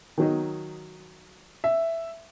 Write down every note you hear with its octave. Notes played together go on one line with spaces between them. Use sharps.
D#3 F#3 D#4
E5